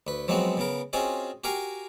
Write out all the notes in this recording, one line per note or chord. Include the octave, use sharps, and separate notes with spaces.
D2 B4
F3 F#3 G#3 B3 C4 F#4
C#3 B3 A#4
C4 C#4 F4 F#4 G#4 D#5
F#4 G4 A#4 F5 G#5